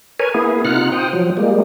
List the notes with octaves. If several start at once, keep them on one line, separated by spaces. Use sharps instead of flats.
A#4 B4 C#5 G#5
A#3 B3 E4 G#4
C3 D#4 F4 F#5 F6 F#6
C5 G5 D#6
F3 F#3
G3 G#3 A#3